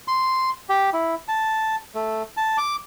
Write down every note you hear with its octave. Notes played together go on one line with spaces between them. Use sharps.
C6
G4
E4
A5
A3
A5
D6